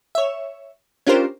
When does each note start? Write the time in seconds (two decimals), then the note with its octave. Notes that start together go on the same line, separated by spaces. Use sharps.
0.15 C#5 E5
1.07 C#4 D4 F4 G4 A#4 C5